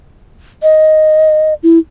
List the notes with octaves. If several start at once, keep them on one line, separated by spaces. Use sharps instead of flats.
D#5
E4